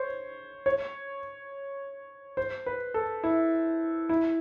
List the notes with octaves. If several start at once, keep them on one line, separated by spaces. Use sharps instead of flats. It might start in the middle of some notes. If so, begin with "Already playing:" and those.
Already playing: C5 C#5
C#5
C5
B4
A4
E4
E4